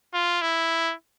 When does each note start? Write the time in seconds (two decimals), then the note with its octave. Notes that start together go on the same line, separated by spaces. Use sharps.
0.14 F4
0.42 E4